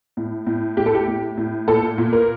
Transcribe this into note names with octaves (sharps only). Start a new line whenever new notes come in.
A2
A2
A2 G4
A4
G4
A2
A2
A#2 A4
A#2
A#4